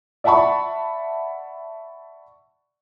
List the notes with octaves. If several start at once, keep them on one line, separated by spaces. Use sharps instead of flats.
D5 E5 F#5 A5 B5 C#6